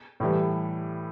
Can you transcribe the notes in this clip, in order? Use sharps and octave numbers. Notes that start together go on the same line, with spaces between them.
A2 E3 G3